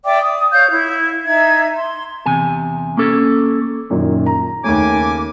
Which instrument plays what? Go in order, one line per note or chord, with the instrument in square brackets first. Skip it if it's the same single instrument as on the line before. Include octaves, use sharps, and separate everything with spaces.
[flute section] D5 E5 G5 D6
D#6
C#5 F5 G6
E4
D#4 E5 G#6
C6
[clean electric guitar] E2 C3 G#5
A#3 C#4 A4
[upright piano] F#2 A#2 D#3
A#5
[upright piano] D#2 A3 [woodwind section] C#3 G#5 D6